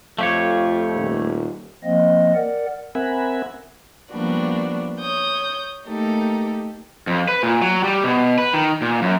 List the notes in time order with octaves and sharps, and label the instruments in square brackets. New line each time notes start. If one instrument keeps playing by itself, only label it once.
[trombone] F2 [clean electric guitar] A3 G4 C#5 [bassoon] F4
[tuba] D#1
[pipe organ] F3 A#3 C4 D#5
A#4 D5 F#5
[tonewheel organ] C4 A#4 E5 F#5 G#5 B5
[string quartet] F3 G3 A#3 B3 D4 F#4
C#5 D#6 G6
A3 A#3 D#4 G4 A4 A#4
[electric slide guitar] F2
B4
A#2
F#3
G3
B2
B4
D#3
A#2
F#2